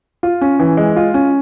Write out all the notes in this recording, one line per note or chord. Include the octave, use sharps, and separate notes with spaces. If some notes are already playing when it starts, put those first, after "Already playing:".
F4
C#4
E3
G#3
F4
C#4